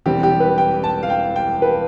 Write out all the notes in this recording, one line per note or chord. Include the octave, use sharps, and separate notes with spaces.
E1 E2 C3 G3 C4 G4
G4
B4
G5
A5
F5
G5
G5
B4